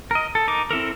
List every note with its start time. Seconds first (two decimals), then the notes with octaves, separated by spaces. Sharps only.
0.11 A#4 D#5
0.35 A4
0.48 D#4 A#4 D6
0.71 C4 E4 A4 A#4